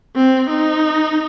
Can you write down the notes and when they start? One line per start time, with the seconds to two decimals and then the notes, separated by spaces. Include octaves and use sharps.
0.16 C4
0.49 D#4